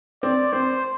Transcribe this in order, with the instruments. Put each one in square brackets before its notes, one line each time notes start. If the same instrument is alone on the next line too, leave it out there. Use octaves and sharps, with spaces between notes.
[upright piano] C4 [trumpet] D5
[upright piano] C4 [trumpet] C5